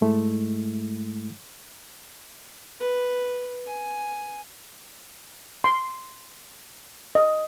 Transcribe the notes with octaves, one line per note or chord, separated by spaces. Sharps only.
G#2 G#3 A3 E4
B4
G#5
C6
D#5